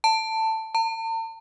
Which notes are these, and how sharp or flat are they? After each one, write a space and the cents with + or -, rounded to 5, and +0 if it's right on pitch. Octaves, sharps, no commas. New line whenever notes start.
A5 +15
A5 +45